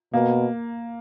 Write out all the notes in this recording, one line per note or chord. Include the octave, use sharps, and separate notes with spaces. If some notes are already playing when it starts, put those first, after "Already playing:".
B2 A#3